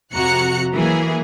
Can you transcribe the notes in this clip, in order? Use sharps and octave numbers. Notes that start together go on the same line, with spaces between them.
F2 C3 F#4 A#5 F#6 C#7
E3 F#3 A#3 G#4